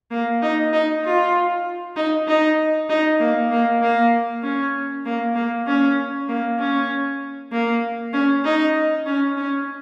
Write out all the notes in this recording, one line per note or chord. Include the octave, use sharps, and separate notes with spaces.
A#3
D#4
D#4
F4
D#4
D#4
D#4
A#3
A#3
A#3
C#4
A#3
A#3
C#4
A#3
C#4
A#3
C#4
D#4
C#4
C#4